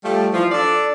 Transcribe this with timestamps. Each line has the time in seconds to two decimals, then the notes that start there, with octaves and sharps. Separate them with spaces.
0.05 F3 G3 A3
0.34 E3 F3
0.52 D4 A4 D5